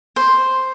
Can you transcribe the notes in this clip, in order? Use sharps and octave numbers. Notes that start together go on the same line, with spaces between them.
C5